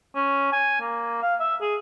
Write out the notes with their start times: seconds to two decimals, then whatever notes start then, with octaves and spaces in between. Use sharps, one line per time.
0.15 C#4
0.52 G#5
0.81 A#3
1.22 F5
1.40 E5
1.61 G#4